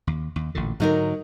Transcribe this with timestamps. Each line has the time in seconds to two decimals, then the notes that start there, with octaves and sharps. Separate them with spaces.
0.07 D#2
0.36 D#2
0.55 A1 A#2 D3
0.80 G#2 D3 F#3 D#4 A#4